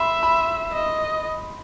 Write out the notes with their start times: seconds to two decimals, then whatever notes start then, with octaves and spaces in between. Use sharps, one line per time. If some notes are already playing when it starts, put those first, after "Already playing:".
Already playing: E5 B5 C6
0.23 B5
0.73 D#5